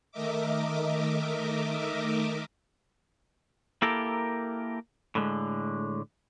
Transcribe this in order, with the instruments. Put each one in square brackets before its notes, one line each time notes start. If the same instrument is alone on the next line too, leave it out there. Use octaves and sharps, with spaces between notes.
[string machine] D#3 A3 A#4 D#5 E5 D6
[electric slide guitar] A#3 E4 G4 A4 A#4
A2 D3 G#3